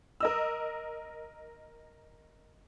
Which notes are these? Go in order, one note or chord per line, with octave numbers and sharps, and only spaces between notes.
A#4 D#5 E6